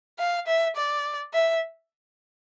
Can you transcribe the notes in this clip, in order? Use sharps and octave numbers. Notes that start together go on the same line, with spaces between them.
F5
E5
D5
E5